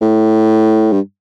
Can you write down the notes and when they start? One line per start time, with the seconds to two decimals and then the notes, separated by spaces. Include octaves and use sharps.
0.01 A2
0.92 G2